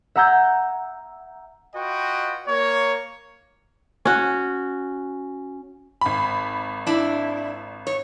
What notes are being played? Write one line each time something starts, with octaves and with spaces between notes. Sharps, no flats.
E5 F#5 A#5 E6 G6 G#6
F4 F#4 B4 D#5 G5
A#3 C#5
C#4 F#4
G#1 B5
D4 E4
C#5